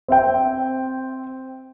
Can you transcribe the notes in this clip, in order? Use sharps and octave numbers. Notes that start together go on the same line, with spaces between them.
C4 E5 G5